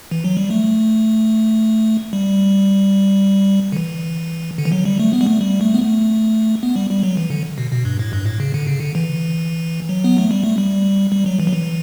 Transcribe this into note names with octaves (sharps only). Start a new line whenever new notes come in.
E3
F#3
G3
A3
G3
D3
E3
D3
E3
F#3
G3
A3
B3
G3
A3
G3
A3
B3
A3
B3
G3
G3
F#3
E3
D3
B2
B2
G2
A2
G2
A2
C#3
D3
C#3
D3
E3
F#3
B3
A3
G3
A3
G3
G3
F#3
E3
F#3
E3